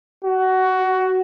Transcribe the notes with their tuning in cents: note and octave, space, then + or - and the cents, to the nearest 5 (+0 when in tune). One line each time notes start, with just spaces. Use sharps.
F#4 +15